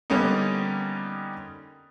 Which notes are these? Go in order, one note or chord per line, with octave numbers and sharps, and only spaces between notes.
D3 G3 A#3 B3 C#4 D#4